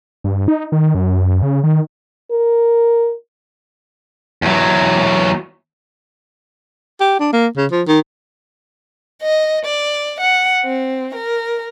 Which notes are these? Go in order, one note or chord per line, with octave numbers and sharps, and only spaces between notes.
G2
D#4
D#3
F#2
C#3
D#3
A#4
E2 F#3
G4
D4
A#3
C#3
F3
D#3
D#5
D5
F#5
C4
A#4